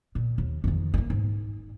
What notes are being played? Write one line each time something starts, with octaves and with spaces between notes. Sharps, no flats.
A#2
D#2
F2 D#3
G3 A#3
G#2